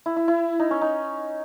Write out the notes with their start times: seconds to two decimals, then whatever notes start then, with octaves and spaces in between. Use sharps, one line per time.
0.06 E4
0.16 E4
0.28 E4
0.60 D#4
0.71 C#4
0.82 D#4